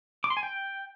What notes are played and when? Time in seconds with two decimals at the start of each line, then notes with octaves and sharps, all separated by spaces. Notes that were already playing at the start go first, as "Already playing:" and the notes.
0.24 D6
0.30 C6
0.37 G#5
0.43 G5